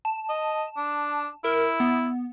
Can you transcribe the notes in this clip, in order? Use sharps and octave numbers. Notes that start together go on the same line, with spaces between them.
A5
D#5
D4
E4 A#4
B3